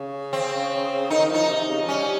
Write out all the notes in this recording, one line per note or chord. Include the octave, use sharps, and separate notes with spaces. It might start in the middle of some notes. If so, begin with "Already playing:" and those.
Already playing: C#3
C4
D#3 D#4
F3 D#4
C3
C#3
F3
G3 C#4